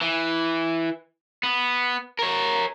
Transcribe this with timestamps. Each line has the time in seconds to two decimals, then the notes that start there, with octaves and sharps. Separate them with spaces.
0.01 E3
1.43 B3
2.19 A#4 C#5